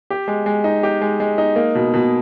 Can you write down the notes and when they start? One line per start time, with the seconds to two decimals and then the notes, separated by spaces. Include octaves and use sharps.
0.10 G4
0.28 G#3
0.46 G#3
0.64 D#4
0.83 G4
1.01 G#3
1.20 G#3
1.38 D#4
1.56 A#3
1.75 B2
1.94 B2